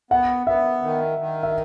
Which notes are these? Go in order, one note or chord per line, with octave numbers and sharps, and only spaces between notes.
B3 F#5
B3 E5
D#3
D#3
E5